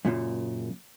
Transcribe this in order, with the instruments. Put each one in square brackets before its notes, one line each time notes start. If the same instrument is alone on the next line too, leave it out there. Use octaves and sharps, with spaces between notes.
[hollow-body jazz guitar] F#2 A#2 C#3